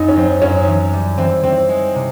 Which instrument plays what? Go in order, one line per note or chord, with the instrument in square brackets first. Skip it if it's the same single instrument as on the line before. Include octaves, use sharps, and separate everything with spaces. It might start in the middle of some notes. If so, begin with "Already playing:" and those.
Already playing: [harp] F#2 [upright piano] D#4
[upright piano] C#4
[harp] F#3 [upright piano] C4
[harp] F#2 [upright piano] C#4
[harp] E3
G3
[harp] E3 [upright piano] C4
[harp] E3 [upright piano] C4
[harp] G#3
C3